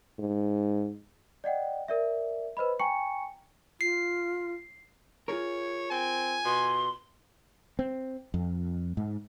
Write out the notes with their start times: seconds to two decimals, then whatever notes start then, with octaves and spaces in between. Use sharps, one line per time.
0.19 G#2
1.44 D5 D#5 F#5 G5
1.88 A#4 D5 E5
2.57 B4 C5 D#5 B5
2.80 G5 G#5 A#5 C#6 C#7
3.81 F4 C7
5.28 F4 G#4 A#4 C#5
5.91 C4 G#5
6.45 B2 C6
7.79 C4
8.34 F2
8.97 G#2